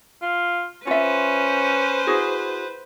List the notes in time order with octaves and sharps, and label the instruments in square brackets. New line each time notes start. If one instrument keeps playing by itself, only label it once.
[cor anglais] F4
[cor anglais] C#4 [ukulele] F4 E5 [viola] B4 C5
[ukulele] E4 F#4 G#4